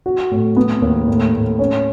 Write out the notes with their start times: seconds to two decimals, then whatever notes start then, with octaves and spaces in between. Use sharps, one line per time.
0.06 F#4
0.31 A2
0.56 B3
0.82 D#2
1.08 A2
1.34 A2
1.59 C#4